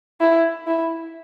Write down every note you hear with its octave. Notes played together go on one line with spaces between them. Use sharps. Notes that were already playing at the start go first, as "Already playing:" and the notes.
E4
E4